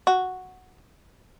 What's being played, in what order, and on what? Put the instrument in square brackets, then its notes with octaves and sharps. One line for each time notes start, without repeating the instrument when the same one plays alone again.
[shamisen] F#4